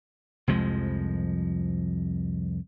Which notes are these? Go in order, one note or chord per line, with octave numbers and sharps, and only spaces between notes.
C2 F2 F3 G#3